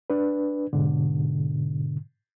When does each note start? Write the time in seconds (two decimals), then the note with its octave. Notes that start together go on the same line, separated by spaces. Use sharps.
0.10 D4 B4
0.73 G#2 B2 D3